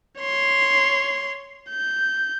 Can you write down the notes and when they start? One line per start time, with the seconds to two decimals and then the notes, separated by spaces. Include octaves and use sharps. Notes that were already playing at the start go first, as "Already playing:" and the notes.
0.20 C#5 C6
1.71 G6